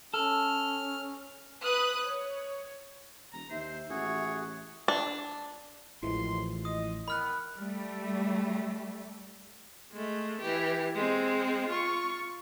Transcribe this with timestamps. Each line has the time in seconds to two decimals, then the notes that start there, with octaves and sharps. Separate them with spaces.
0.14 C#4 A4 F6
1.64 B4 D#6 F#6
2.05 C#5
3.33 E1 A#5
3.50 D#2 C5 E5
3.90 A1 F#4 G#4 C#5
4.88 D4
6.03 A1 D#2 A2 E3 F3 G#3 C6
6.65 D#5 D#6
7.08 D#3 B3 B5 F6 F#6
7.57 G3 A3
9.92 G#3 A3
10.41 E3 G4
10.95 G#3 C4
11.69 F4 C#6